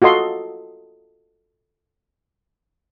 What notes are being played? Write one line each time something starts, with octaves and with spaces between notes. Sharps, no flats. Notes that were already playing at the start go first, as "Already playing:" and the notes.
F4 F#4 A4 D#5 C6